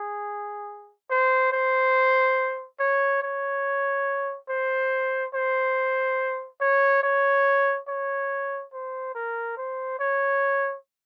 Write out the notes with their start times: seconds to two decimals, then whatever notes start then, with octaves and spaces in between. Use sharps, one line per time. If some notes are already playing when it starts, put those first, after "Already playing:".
Already playing: G#4
1.10 C5
1.52 C5
2.80 C#5
3.23 C#5
4.49 C5
5.34 C5
6.61 C#5
7.03 C#5
7.88 C#5
8.73 C5
9.15 A#4
9.57 C5
9.99 C#5